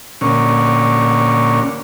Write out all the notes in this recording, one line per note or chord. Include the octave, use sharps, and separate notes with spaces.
A#2 D3 C#4